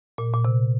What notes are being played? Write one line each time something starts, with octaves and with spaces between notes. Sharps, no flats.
A#2
A#2
C3